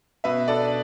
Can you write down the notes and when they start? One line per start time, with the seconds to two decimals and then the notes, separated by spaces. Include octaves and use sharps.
0.24 B2 B4 E5
0.48 D4 A4 D5